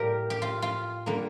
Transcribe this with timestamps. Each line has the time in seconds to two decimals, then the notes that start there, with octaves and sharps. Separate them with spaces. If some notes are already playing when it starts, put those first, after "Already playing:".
Already playing: A2 G3 A#3 G4 A#4
0.30 G4
0.42 F4
0.62 F4
1.06 D3 G3 A#3